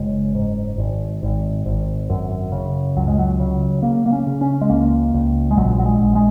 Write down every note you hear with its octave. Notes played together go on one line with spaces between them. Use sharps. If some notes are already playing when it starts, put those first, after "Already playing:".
Already playing: F#1 C#3 G#3
G#2
G#1
G#1
G#1
F#2
C#3
C#2 F#3
G#3
F#3
C#3
C#3 A#3
A#3
C#4
C#3
C#4
G#3
C#2 A#3
C#2
G#3
A#1 F#3
F#3
G#3
A#1
G#3